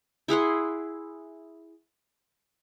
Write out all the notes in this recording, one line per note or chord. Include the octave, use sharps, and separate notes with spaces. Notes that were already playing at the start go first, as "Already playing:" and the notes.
E4 G#4 F#5 C6